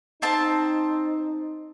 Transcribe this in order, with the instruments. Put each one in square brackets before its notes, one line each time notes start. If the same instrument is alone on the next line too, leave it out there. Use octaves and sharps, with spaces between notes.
[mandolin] C4 A5 [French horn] D#4